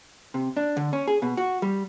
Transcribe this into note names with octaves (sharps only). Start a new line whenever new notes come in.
C3
D4
D3
C#4
G#4
B2
F#4
G3